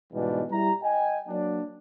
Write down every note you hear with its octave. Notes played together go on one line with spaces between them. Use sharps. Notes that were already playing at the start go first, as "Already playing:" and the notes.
E2 G#2 B2 G3 D4
G3 E4 G4 A#5
D#5 G5 G#5
F#3 A#3 D4